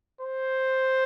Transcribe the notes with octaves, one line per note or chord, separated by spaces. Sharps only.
C5